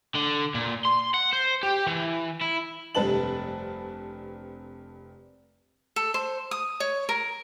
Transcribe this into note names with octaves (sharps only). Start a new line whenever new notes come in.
D3
A#2
C6
F#5
C5
G4
E3
E4
F1 G2 C4 B4 A5 F#7
A4
C5
D#6
C#5
A#4